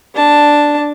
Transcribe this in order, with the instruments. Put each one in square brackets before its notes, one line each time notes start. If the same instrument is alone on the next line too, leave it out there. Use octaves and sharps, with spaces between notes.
[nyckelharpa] D4 A5